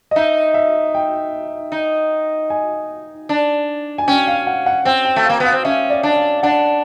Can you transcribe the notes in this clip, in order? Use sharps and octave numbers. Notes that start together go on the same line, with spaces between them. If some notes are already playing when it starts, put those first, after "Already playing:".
D#5
D#4 E5
E5
G5
D#4
G#5
D4
G#5
C#4 G5
F5
F#5
F#5
C4 G5
G5
A3
A#3 F5
B3 F5
C4
C#4 E5
D5
D4
F5
D4 F#5